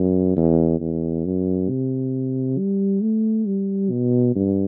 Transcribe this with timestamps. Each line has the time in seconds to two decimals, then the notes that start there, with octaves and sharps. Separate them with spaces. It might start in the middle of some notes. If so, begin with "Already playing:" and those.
Already playing: F#2
0.36 E2
0.80 E2
1.25 F#2
1.69 C3
2.58 G3
3.02 A3
3.47 G3
3.91 B2
4.36 G2